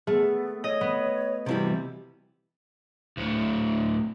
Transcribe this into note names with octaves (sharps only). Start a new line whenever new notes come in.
A3 B3 G#4
C#5 D#5
B3
C3 E3 G3 F#4
D2 A2